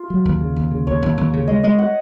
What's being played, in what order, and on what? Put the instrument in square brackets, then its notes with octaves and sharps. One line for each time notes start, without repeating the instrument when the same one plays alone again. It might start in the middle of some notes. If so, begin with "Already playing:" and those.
Already playing: [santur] F4
[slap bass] F#3
D#2
C#3
D#2
C#3
[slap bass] D#2 [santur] C#5
[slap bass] D#2
D#2
C#3
[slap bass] G#3 [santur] D#5
[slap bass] G#3 [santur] D#5
[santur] F#5